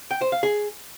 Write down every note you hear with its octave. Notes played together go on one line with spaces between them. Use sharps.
G5
C5
F5
G#4